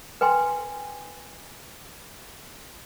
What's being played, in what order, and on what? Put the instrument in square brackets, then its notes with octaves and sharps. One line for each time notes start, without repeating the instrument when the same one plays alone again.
[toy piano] B4 G5 G#5 C6